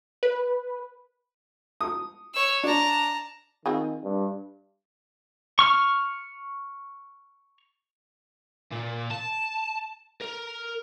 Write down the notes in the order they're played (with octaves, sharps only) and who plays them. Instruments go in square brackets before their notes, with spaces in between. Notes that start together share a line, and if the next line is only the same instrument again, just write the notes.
[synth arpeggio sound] B4
[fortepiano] D#6
[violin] C#5 E6
[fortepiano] D4 [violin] A5 A#5
[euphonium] D#3 [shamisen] C4 F4 G#4
[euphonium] G2
[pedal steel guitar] C#6 F6
[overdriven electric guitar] A#2
A5
A#4